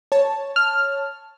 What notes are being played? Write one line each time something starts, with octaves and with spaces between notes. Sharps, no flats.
C#5 A5
F6